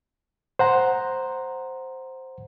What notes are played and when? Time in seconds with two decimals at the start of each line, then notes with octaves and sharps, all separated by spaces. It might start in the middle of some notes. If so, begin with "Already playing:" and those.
0.59 C5 F#5 A#5